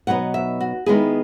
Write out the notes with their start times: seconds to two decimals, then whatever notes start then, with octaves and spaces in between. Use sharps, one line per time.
0.07 B2 F#3 B3 D#4 F#5
0.34 E5
0.61 F#4
0.86 D#3 G#3 B3 E4 G#4